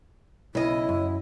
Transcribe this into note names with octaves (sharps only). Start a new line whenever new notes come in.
B1 C#3 E4 D#5
F#2